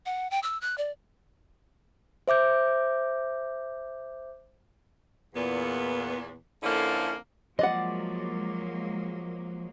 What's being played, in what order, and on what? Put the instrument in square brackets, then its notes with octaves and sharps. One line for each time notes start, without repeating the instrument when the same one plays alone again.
[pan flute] F#5
G5
E6
F#6
D5
[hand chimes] C5 E5 D6 G6
[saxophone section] E2 A#2 B3
D3 F3 A#3 C#4 E4 A4
[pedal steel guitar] F3 D5 [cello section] F#3 G#3 A#3 [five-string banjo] D#5 F#5